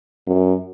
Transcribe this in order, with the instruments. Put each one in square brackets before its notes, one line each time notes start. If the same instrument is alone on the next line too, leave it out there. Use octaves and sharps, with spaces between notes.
[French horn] F#2